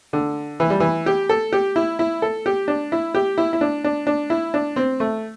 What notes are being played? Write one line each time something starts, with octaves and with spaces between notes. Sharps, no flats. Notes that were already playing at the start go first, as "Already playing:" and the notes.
D3
E3
G3
E3
G4
A4
G4
E4
E4
A4
G4
D4
E4
G4
E4
E4
D4
D4
D4
E4
D4
C4
A3